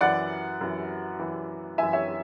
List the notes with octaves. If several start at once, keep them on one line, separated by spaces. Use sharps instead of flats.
F#2 E3 D5 F#5
F#2 E3
F#2 E3
F#2 E3 E5 G#5
C#5 E5